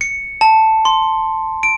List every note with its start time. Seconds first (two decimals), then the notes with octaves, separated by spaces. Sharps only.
0.01 C#7
0.41 A5
0.85 C6
1.63 D7